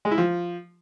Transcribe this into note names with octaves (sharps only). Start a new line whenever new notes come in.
G#3
E4
F3